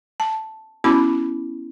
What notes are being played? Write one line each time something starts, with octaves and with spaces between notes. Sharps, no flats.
A5
B3 C#4 E4 F#4 B5 D6